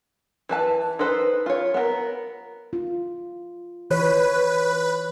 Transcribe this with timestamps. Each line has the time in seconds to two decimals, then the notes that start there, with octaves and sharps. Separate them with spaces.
0.49 E3 B4 A5
0.99 D#4 A4 B4 C5
1.46 F4 C#5
1.74 B3 A#4
2.73 F4
3.90 E3 B4 C#5